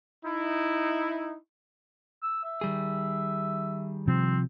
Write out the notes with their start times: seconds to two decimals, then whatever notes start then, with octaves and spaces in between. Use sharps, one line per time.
0.25 D#4 E4
2.22 E6
2.44 E5
2.61 D#3 G3 G#4
4.08 C3 F3 C4